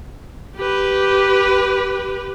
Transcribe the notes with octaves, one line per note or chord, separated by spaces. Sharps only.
G4 B4